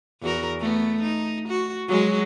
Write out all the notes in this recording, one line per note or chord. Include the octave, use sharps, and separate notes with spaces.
E2 F#4 A#4
A3 B3
D#4
F#4
F#3 G#3 F#4